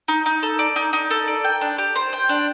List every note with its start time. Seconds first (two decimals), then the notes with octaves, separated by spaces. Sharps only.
0.08 D#4
0.26 D#4
0.43 A4
0.59 D5
0.76 D#4
0.93 D#4
1.10 A4
1.27 D5
1.44 G5
1.61 D4
1.78 G4
1.96 C5
2.13 G5
2.29 D4